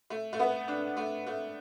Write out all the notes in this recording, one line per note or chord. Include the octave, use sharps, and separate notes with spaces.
A3
A3
B3
D4
A3
A3